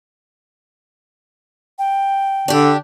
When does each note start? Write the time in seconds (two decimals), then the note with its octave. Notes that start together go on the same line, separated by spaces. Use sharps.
1.78 G5
2.48 D3 D4 G4